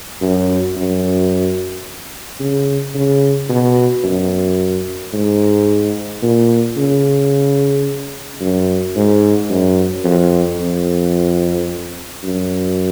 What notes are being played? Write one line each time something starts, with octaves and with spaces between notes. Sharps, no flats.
F#2
F#2
C#3
C#3
B2
F#2
G#2
A#2
C#3
F#2
G#2
F#2
F2
F2
F#2